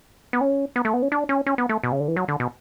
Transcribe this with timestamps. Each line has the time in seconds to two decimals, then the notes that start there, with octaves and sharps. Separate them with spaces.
0.33 B3
0.41 C#4
0.76 B3
0.85 A3
0.94 B3
1.02 C#4
1.12 D4
1.29 C#4
1.46 C#4
1.58 B3
1.69 A3
1.84 B2
1.92 C#3
2.00 D3
2.08 E3
2.16 F#3
2.28 D3
2.40 B2